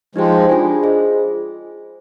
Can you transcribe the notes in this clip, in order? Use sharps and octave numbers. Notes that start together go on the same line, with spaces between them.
F3 G#3 D#4 G4 C5 G5
D4 F4 G#4 D5 G#5
F4 G#4 C5 D#5